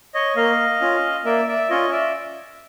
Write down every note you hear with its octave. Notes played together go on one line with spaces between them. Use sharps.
C#5 D#5
A#3 D#5 F5
C#4 F4
A#3 D5 E5
D5 E5
C#4 F4 C#5 D#5
D5 E5